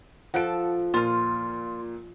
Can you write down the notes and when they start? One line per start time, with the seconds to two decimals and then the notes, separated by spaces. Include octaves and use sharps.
0.34 F3 A4 F#5 F#6 D7
0.94 A#2 F4 F6